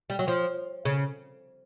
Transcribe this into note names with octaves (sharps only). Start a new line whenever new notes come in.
G3
F#3
F3
C#3